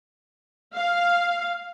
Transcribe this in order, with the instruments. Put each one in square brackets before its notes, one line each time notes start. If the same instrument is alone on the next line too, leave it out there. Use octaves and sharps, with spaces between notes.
[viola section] F5